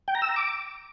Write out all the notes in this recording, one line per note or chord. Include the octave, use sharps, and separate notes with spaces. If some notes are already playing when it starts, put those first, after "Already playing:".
G5
A#5
E6
A#5
D6